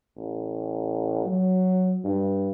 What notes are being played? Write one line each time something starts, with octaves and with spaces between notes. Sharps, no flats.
A1
F#3
G2